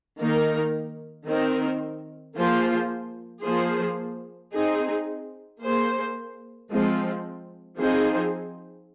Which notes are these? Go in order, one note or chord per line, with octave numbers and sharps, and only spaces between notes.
D#3 A#3 D#4 A#4
D#3 C4 D#4 A#4
F3 A#3 F4 G#4 C5
F3 A#3 G#4 C5
C4 D#4 G#4
A#3 G#4 C5
F3 G#3 C4
F3 C4 D#4 G#4 C5